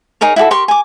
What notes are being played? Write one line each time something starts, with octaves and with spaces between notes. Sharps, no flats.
D#4 G#4 A#4 C#5
E4 F#4 G4 A4
G4 A#4 C6 C#6
G#5 D6